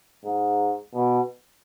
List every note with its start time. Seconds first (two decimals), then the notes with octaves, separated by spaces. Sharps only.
0.24 G#2
0.94 B2